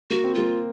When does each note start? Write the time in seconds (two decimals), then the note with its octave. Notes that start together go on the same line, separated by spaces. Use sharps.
0.10 A#3 F#4
0.24 C4
0.35 A#3 F4